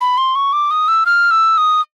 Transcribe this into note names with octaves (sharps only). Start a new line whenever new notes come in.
B5
C6
C#6
D6
D#6
E6
F6
E6
D#6